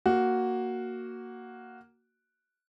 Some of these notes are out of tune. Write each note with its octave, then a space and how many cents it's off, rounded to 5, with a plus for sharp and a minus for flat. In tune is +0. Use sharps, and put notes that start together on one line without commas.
A#3 +0 F#4 +0